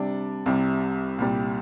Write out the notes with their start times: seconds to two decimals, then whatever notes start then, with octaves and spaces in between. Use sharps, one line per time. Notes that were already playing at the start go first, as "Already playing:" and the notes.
Already playing: C3 G3 D4
0.46 C2 C3 G3
1.18 C2 A#2 G3